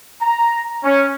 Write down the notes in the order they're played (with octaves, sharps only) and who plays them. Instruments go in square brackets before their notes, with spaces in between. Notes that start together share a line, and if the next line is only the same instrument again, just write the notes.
[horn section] A#5
C#4